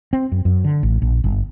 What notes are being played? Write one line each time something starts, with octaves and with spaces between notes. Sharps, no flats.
C4
F#2
F#2
D3
A1
A#1
G1